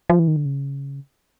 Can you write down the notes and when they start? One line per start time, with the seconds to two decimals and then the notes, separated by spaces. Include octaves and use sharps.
0.10 F3
0.19 E3
0.28 D#3
0.36 D3
0.46 C#3